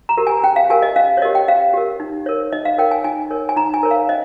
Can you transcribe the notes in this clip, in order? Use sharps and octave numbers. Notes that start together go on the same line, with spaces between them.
A#5
G4 A#4
G#5
C#4 G5
F5
G4 A#4 G#5
D#5
C#4 F5
C#5
G4 A#4 D#5
G5
C#4 F5
G4 A#4
D#4
A#4 C#5
D#4 D#5
F5
A#4 C#5 G5
G#5
D#4 G#5
A#4 C#5
G#5
D#4 A#5
G#5
A#4 C#5
F5
C#4 D#5